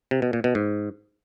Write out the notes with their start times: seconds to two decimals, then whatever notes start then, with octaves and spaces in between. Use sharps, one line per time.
0.11 C3
0.22 B2
0.33 A#2
0.44 B2
0.55 G#2